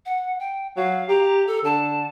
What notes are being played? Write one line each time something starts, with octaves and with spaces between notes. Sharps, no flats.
F#5
G5
F#3 F5
G4 A#5
A4
D3 A5